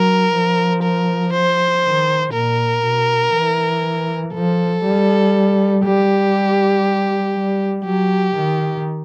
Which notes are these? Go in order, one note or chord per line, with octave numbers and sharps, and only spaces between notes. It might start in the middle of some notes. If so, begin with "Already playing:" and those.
Already playing: F#3 A#4
F3
A#4
C5
D#3
A#2 A#4
B2
E3
F3 A4
G3
G3 G4
G3
F#3 G4
D#3